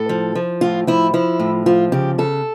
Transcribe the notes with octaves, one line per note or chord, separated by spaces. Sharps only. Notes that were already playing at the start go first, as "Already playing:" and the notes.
Already playing: A2 A4
F3
F3
A2 F4
F3 E4
F3 E4
A2
F3 F4
C#3 G4
C#3 A4